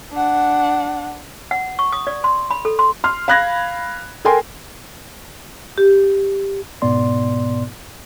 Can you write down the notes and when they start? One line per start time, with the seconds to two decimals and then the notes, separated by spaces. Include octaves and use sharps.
0.13 D4 F#5
1.51 F#5
1.79 C#6
1.93 D#6
2.07 D5
2.24 C6
2.51 B5
2.65 A4
2.79 C6
3.04 C6 F6
3.28 F5 B5 F#6 G#6 A#6
4.25 A4 A#4 G5 G#5 C6
5.78 G4
6.82 G#2 B2 B3 D5 C6